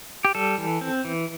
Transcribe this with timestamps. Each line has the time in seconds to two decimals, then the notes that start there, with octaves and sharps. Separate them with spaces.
0.25 G4
0.35 G3 A4
0.58 E3
0.81 C4
1.05 E3